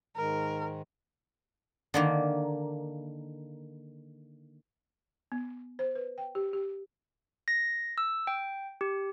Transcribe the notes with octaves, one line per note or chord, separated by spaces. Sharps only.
G#2 D#3 G#3 A#4
D3 D#3 A#3
B3
C5
B4
G5
G4
G4
A#6
E6
G5
G4